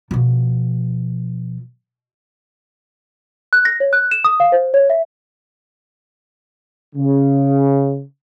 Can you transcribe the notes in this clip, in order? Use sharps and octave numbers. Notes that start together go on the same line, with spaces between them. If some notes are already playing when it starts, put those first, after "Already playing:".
B2 F3
F#6
A#6
C#5
F#6
E7
D#6
F5
C5
C#5
E5
C#3